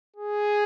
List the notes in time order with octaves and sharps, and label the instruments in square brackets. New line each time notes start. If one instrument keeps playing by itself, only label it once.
[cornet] G#4